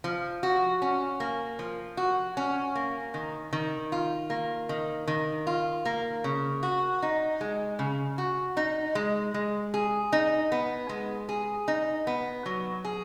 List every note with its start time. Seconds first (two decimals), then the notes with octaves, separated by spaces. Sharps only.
0.04 F3
0.43 F#4
0.82 C#4
1.20 A#3
1.59 F3
1.97 F#4
2.37 C#4
2.75 A#3
3.14 D#3
3.53 D#3
3.92 F4
4.30 A#3
4.69 D#3
5.08 D#3
5.47 F4
5.86 A#3
6.24 C#3
6.63 F#4
7.03 D#4
7.41 G#3
7.79 C#3
8.18 F#4
8.57 D#4
8.95 G#3
9.34 G#3
9.74 G#4
10.13 D#4
10.52 B3
10.89 G#3
11.29 G#4
11.68 D#4
12.07 B3
12.46 F#3
12.85 G#4